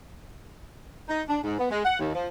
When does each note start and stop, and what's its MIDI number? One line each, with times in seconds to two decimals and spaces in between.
1.08 1.21 63
1.28 1.38 62
1.43 1.58 44
1.59 1.70 59
1.70 1.81 56
1.85 1.96 78
1.99 2.10 39
2.14 2.27 53